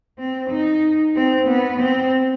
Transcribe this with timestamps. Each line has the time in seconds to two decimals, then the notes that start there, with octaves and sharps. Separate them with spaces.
0.18 C4
0.50 D#4
1.16 C4
1.48 B3
1.80 C4